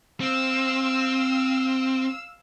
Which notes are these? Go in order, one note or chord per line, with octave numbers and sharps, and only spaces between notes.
C4 F5 E6